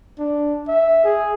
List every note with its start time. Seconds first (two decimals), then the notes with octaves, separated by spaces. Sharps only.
0.19 D4
0.68 E5
1.04 G#4